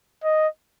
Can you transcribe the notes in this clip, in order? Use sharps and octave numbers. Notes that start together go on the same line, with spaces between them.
D#5